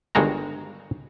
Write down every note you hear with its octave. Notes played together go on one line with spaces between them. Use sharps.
G1 G2 D#3 G#3 F#4 A#5